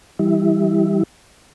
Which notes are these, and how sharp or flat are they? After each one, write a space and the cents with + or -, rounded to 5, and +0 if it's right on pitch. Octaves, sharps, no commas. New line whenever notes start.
E3 +0 G3 +0 E4 -20